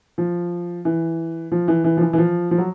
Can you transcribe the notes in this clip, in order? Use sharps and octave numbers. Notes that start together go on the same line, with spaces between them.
F3
E3
F3
E3
E3
F3
E3
E3
F3
F3
F#3